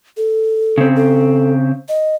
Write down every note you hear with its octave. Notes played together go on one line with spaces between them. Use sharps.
A4
C#3 C4
A4
D#5